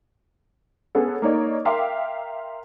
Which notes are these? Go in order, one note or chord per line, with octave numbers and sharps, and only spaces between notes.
B3 C#4 G#4 A4
A#3 D#4 C#5 D5
A#4 E5 F5 G5 C6 D6